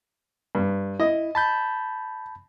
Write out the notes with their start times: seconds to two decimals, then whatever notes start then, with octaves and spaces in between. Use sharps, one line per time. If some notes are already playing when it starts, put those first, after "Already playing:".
0.55 G2
1.00 E4 D#5
1.35 A5 B5 G6